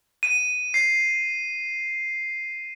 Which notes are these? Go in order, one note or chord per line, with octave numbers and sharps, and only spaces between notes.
D#7
C7